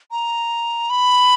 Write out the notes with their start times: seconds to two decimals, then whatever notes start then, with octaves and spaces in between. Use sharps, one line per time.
0.12 A#5
0.90 B5